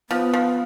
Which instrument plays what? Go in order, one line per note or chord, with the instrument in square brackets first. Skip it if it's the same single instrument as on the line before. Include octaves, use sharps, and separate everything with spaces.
[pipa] F3 [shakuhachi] B3
[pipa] F3